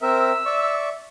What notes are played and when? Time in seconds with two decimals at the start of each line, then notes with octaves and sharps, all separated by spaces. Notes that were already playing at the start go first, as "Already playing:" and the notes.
0.01 C4 A#4 E5 E6
0.45 D5 E5 C#6